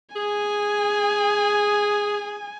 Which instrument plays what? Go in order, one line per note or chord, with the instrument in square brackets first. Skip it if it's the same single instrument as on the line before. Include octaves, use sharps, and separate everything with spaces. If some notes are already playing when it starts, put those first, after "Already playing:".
[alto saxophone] G#4 [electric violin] G#5